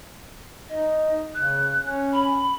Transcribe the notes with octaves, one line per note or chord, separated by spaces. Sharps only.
D#4 D#5
C#3 F#6
C#4
B5